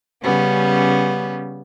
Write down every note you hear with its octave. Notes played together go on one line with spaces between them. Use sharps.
C#3 G3 B3 C#4